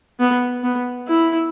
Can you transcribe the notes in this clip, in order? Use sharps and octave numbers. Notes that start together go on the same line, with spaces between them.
B3
B3
E4